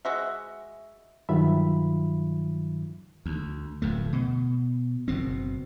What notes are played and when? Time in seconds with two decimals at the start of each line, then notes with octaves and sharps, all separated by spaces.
0.05 G#3 F#4 E5
1.29 G2 D#3 F#3 F4 E5 B5
3.26 D2
3.82 D1 F2 A3
4.13 B2
5.08 F#1 B2 C4